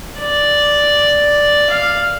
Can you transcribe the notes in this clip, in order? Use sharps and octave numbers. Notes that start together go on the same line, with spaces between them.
D5
F5